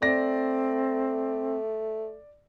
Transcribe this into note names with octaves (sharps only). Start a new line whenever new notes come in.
A3 C4 D5 A#6